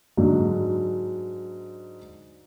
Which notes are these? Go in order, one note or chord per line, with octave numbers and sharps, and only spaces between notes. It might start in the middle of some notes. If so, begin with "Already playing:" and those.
G#2 D3 F#3